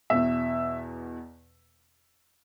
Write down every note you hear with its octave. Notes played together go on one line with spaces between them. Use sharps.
E2 B2 E5